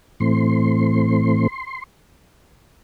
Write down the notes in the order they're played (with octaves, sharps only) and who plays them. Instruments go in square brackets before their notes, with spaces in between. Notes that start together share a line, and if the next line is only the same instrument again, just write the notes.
[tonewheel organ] A2 E3 A3 C4 C6